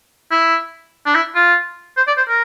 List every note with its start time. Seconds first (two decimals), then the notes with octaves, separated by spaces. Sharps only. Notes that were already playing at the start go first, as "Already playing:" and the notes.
0.31 E4
1.06 D4
1.15 E4
1.35 F4
1.97 C5
2.07 D5
2.17 C5
2.28 A#4